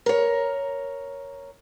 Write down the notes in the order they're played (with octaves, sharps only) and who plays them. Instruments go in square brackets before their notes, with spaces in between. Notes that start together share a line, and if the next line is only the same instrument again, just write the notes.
[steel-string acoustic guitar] A#4 C#5